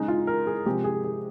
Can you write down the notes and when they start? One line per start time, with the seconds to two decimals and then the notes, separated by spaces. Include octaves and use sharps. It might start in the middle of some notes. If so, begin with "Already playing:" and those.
Already playing: C#3 G#3 D#4
0.08 F4
0.27 A#4
0.47 G#4
0.66 C3 F3 G#3 G4
0.84 G#4
1.04 G#4